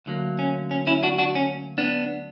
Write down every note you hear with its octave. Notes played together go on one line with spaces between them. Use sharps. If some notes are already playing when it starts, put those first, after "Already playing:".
D2 D3 F#3 A#3
C#4
C#4
C#4 E4
D4 F#4
D4 F#4
C#4
B3 D4